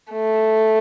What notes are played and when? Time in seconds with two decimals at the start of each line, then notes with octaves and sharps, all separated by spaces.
0.12 A3